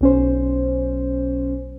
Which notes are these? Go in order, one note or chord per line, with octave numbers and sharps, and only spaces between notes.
B1 C#4 C5